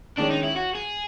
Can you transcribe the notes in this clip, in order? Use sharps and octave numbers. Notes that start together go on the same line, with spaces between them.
D#3 G#3 C#4 D4
D#4
E4
F#4
G#4